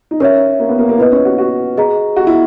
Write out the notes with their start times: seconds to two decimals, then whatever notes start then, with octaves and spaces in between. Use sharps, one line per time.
0.11 D#4
0.20 C#4 A#4 C#5 E5
0.60 A#3
0.69 B3
0.79 A#3
0.89 A#3
0.98 B3 E4 B4 D#5
1.12 C#4
1.25 F#4
1.38 F#4
1.78 G#4 D#5 A#5
2.16 F#4
2.27 E4